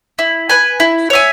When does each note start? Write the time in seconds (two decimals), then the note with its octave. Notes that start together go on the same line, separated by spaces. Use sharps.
0.19 E4
0.50 B4 G#5
0.80 E4
1.10 C#5 E5 G#5